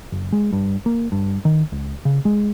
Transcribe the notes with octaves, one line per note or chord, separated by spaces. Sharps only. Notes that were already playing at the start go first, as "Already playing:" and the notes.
F#1
G#3
G2
A#3
G2
D#3
C#2
C#3
G#3